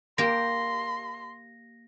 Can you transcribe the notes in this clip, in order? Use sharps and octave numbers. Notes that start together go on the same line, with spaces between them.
A#3 G4 C6 A#6